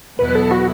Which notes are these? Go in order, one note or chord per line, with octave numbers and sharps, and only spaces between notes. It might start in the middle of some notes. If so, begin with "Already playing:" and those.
E2 B2 F#3 B3 E4 B4
A4
F#4